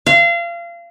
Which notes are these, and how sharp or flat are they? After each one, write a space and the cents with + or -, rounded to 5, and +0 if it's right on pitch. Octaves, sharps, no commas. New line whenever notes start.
F5 -30